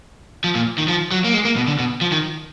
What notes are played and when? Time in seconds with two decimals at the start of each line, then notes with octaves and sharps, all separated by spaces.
0.44 F3
0.55 A#2
0.78 D#3
0.88 F3
1.11 F#3
1.24 A#3
1.34 G#3
1.45 A#3
1.56 B2
1.67 D3
1.79 B2
2.01 F3
2.12 D#3